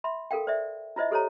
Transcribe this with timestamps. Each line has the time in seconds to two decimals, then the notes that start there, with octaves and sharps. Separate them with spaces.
0.04 E5 B5 C6
0.31 A4 A#4 F5 G5
0.47 C5 D5 E5
0.96 E4 F4 C5 D#5 E5
1.11 G4 A4 C5 C#5 A#5